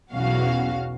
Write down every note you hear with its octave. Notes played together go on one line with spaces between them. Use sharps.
B1 E2 B2 C#4 F#4 F5